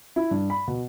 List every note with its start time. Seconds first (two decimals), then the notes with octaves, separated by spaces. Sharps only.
0.16 E4
0.31 G2
0.50 B5
0.68 B2